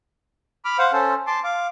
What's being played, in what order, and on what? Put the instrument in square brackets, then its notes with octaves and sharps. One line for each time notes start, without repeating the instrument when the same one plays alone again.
[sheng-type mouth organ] B5 D6 F6
C5 F5 F#5
C#4 A4 C5
A5 C6 D6
F5 D6